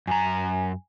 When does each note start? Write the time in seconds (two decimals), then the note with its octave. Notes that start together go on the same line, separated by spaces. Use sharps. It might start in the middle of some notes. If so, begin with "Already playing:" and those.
0.07 F#2 G#5 A#5